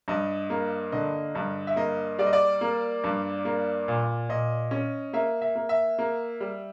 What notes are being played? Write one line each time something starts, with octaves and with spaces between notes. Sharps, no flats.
G2 D#5
A#3
D3 D#5
G2
E5
A#3 D#5
G3 D5
D#5
D5
A#3
G2
A#3
A#2
A#2 D#5
C#4
A#3 E5
E5
A#3
E5
A#3
G3